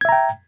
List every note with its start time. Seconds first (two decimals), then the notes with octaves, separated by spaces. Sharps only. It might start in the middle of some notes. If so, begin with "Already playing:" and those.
0.01 G#6
0.05 E5
0.09 A#5
0.12 G5